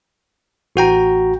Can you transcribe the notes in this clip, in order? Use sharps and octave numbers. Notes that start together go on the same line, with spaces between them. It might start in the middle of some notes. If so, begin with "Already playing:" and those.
A1 F#4 G5 A#5